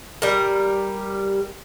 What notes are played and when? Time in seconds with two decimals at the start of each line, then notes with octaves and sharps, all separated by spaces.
0.22 G3 A#4